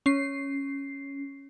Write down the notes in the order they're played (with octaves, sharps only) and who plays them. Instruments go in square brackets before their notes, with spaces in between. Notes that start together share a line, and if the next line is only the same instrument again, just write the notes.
[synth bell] C#4 C7